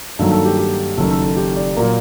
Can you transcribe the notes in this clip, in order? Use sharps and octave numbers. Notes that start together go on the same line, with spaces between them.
G2 D#3 F#3 A#3 A4
A4
G4
G4
F#1 F#2 D#3 A4
A4
A4
G4
D5
A#2 F#3 A#3